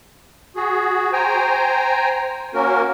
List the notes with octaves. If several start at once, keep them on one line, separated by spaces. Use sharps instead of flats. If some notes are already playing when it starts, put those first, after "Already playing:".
F#4 G#4
C5 G5 G#5 A#5
A#3 C#4 F#4 A#4